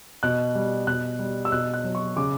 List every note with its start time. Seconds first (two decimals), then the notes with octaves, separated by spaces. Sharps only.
0.23 B2 F#6
0.55 G3
0.87 B2 F#6
1.19 G3
1.45 E6
1.52 B2 F#6
1.74 F#6
1.84 F#3
1.95 C#6
2.16 C#3 D6